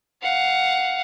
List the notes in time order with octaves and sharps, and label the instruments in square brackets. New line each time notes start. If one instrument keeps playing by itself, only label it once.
[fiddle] F5 F#5